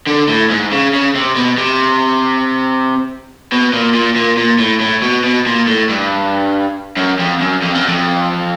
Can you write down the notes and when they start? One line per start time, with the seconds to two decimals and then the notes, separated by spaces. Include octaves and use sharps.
0.07 D3
0.28 A2
0.50 G#2
0.71 C#3
0.93 C#3
1.15 C3
1.36 B2
1.58 C3
3.52 B2
3.73 A#2
3.95 A#2
4.16 A#2
4.38 A#2
4.59 A2
4.81 A2
5.02 B2
5.24 B2
5.46 A#2
5.67 A2
5.89 G2
6.97 F#2
7.19 F2
7.40 F#2
7.62 F2
7.75 F#2
7.88 F2